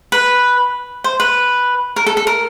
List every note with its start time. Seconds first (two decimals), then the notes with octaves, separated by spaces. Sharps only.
0.12 B4
1.04 C5
1.20 B4
1.96 A#4
2.06 A4
2.17 A4
2.27 A#4